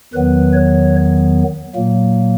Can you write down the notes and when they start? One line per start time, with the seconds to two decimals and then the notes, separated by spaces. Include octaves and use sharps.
0.14 E2 D#3 F#3 B3 B4
0.53 C#5
1.75 A#2 F#3 A#3